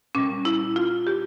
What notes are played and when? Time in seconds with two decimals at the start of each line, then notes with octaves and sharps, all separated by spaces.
0.15 A#2 G3 C#4
0.45 E4
0.76 F4
1.07 G4